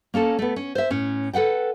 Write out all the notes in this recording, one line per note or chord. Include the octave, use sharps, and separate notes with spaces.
A#3 C#4 A4 A5
A3 B3
C#4
C5 E5
A2 C#4
A4 B4 F#5 G5